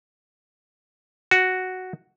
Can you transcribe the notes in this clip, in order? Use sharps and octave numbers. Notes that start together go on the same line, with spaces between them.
F#4